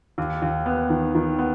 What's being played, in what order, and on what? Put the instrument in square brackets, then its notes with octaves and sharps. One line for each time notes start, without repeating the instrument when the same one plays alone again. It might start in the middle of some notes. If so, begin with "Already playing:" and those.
[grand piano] D#2
D#2
B3
D#3
D#3
B3